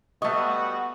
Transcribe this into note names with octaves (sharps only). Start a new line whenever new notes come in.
G3 A3 B3 F#4 D#5 C#6